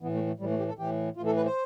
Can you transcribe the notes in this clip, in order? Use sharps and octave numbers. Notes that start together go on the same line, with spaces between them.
A2 E3 B3
A3
A3
A2 E3 G3
A3
G4
A4
A2 E3 G4
A2 E3 F4
A4
B4
C5